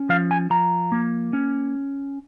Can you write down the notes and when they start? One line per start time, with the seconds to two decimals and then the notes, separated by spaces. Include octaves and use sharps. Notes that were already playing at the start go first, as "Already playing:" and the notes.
Already playing: C#4
0.09 F3 F5
0.31 G#5
0.50 F3 A#5
0.92 A#3
1.33 C#4